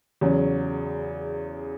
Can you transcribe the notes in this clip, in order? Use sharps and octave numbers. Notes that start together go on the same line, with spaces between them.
E2 C#3 F#3